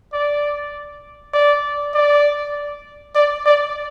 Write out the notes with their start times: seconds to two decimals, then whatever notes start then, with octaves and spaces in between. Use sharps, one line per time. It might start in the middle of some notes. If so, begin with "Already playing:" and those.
0.13 D5
1.34 D5
1.94 D5
3.15 D5
3.46 D5